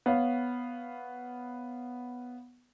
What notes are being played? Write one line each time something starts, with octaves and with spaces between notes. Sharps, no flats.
B3 C#5 F5